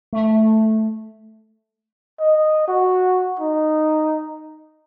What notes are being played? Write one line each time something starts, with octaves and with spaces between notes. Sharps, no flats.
A3
D#5
F#4
D#4